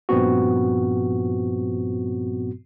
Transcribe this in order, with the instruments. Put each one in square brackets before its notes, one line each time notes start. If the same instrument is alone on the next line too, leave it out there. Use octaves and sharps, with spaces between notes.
[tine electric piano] G2 A#2 F3 B3 C4 F#4